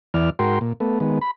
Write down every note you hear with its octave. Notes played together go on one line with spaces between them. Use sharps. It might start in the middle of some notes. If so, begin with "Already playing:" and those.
E2 E3 D5 F6
G#2 F#4 A#4 G5 C6
A#2
A3 B3
D#3 G#3 B3
B5